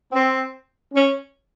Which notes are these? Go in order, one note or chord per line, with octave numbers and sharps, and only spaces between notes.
C4
C#4